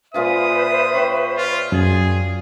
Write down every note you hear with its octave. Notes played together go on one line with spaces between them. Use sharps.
A#2 F4 G#4 B4 C5 E5 D#6
C#5 G5
F4
F#2 G#4